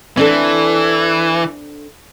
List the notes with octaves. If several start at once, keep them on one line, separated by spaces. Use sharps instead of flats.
E3 C4 D4 A4